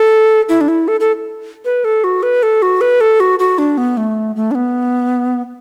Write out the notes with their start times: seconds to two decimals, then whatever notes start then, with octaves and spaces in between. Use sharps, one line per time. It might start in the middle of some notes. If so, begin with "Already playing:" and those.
Already playing: A4
0.49 E4
0.61 D4
0.68 E4
0.88 A4
1.00 A4
1.65 B4
1.84 A4
2.04 F#4
2.23 B4
2.43 A4
2.62 F#4
2.81 B4
3.01 A4
3.20 F#4
3.39 F#4
3.58 D4
3.78 B3
3.97 A3
4.36 A3
4.51 D4
4.55 B3